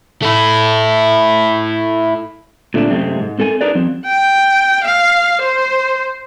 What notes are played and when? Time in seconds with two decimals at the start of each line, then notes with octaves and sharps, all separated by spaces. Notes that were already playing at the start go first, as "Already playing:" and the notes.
0.23 A3 E4
2.74 A#2 D3 A3 C4 D4
2.90 F#2 C3 G#3 A3 C4
3.20 G#2
3.39 C4 A4 A#4 G#5
3.61 D4 D#4 G#4 A#4 B4 D5
3.75 F3 F#3 C4
4.06 G5
4.84 F5
5.42 C5